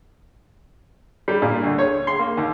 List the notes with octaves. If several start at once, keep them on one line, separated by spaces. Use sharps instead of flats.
G3
A#2
D2
C#5
C6
A#3
D#2